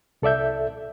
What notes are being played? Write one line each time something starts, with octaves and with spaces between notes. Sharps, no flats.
C2 A4 D5 E5 G6